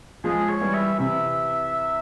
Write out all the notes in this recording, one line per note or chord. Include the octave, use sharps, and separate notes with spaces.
F3 G#3 G#4
C#5
E3 G3
E5
C3 E3 E5